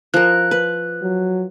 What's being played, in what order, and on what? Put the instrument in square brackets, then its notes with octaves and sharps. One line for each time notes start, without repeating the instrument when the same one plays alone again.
[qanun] F3 A#4 [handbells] F#6
[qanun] B4
[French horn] F#3